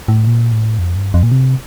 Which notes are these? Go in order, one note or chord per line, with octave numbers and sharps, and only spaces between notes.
A2
A#2
A2
F2
G2
F2
A#2
C3